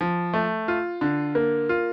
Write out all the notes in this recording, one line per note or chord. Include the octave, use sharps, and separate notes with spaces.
F3
A3
F4
D3
A#3
F4